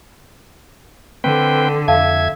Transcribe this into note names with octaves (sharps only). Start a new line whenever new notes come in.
D3 C4 B4 G5
F2 E5 F5 A5 G#6